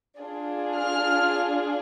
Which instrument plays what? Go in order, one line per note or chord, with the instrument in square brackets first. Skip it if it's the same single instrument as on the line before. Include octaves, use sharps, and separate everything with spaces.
[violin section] D4 F4 G#4
F6